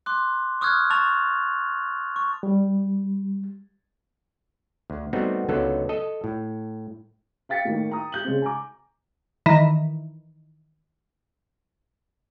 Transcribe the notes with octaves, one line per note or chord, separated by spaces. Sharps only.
C6 D6 F#6
C#6 D#6 F6 F#6 G#6
A5 C#6 A6 F7
C#6
G3
D2
G3 A3 B3 C4 D#4 F#4
C#2 D3 F#3 B3 D#4 A4
A4 D#5
A2
F5 G5 A6 B6 C#7
A2 D#3 A#3
G5 A#5 D#6
G4 G6 F#7
C#3 G#3 C4
G#5 A#5 D6
D#3 E3